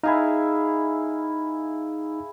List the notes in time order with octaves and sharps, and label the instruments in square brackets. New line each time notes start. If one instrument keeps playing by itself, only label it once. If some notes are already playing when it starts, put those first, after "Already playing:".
[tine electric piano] D#4 [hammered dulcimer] E4 G#4 F5